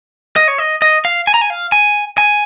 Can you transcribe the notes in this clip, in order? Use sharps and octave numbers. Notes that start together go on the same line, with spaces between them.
D#5
C#5
D#5
D#5
F5
G#5
A#5
G#5
F5
G#5
G#5